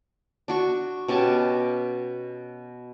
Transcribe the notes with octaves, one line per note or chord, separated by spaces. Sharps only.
D4 F#4 C#6
B2 C#4 G4 A5